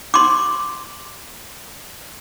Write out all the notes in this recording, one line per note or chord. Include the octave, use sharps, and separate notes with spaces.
C6 D6